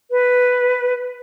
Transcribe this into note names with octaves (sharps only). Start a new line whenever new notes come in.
B4